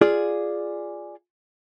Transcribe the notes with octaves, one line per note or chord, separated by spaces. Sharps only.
F4 G#4 D5